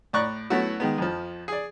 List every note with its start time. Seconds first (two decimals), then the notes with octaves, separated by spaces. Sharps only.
0.13 A2 D5 A#5 C#6 F#6
0.50 F#3 A3 B3 C#4 E4 F#4
0.80 D#3 G#3 B3
0.98 F2 F3
1.48 G#4 D5